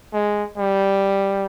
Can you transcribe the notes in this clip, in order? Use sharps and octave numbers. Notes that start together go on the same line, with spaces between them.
G#3
G3